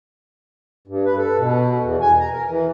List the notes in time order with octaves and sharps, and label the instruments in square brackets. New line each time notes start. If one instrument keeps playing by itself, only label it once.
[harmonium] G2
B4
A4
B2
E2
G#5
A#5
A#4
E3